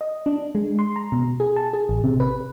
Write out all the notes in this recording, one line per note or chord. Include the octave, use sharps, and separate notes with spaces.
D#5
D4
G#3
C6
A#5
B2
G#4
A5
G#4
A1
C3
B4